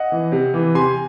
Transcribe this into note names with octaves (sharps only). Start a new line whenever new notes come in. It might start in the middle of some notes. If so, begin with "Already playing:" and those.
Already playing: D#5 F#5
E3
C3
E3
C3 G#5 C6